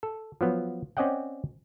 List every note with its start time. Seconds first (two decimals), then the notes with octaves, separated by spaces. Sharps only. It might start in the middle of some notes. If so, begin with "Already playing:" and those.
0.03 A4
0.41 F3 F#3 B3
0.97 C4 C#4 D5 D#5 F#5 G5